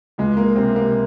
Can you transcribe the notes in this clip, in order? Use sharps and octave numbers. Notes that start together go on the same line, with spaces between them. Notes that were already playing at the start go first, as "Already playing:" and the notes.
C#2 G#3
A#3
C3 C4
A#3